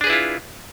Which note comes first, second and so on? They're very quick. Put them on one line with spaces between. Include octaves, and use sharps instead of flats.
D4 G#4 B4 E4 F4